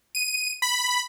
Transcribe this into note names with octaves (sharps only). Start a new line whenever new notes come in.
D#7
B5